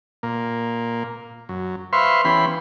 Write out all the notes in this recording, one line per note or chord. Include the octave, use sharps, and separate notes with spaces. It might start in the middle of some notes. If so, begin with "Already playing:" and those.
A#2 A#3
F#2
B4 C5 E5 F5 C6 C#6
E3 B3 C#4 G4 B5 C6